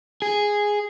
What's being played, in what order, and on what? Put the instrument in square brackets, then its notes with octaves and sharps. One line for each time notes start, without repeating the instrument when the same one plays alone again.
[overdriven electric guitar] G#4